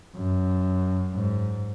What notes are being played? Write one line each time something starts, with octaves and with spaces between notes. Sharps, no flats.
F#2
G#2